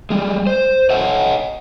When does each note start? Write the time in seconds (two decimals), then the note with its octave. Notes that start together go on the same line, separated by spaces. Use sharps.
0.10 G3 G#3
0.47 C5
0.90 C#5 D#5 F#5